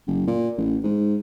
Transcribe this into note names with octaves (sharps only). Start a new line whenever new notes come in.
F#1
A#2
A1
G#2